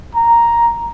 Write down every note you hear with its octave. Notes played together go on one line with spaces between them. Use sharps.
A#5